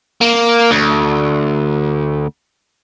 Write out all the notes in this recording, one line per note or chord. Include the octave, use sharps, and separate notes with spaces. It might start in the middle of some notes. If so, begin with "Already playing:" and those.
A#3
D2